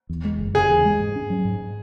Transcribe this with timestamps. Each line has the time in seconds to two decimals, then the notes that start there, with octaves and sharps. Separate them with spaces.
0.09 E2
0.25 G#3
0.39 F#1
0.54 C#3 G#4
0.70 E2
0.85 G#3
1.00 G#2
1.16 C#4
1.30 F#3
1.45 G#2